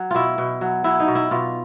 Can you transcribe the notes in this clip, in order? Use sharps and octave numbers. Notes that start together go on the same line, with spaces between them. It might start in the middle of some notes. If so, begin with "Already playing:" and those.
Already playing: F#3
B2 E4 F4
B2
F#3
F#3 E4
D#4
B2
E4
B2 F4